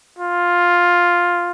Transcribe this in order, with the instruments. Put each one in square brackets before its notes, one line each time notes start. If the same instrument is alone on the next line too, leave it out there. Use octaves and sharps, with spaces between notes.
[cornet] F4